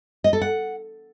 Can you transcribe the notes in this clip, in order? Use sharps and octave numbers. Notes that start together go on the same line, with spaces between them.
D#5
A4
F#5